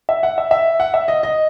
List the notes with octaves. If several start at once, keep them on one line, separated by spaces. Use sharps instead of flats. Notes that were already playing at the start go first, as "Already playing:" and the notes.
E5
F#5
E5
E5
F#5
E5
D#5
D#5